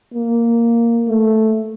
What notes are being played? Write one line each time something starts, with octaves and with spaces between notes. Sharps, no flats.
A#3
A3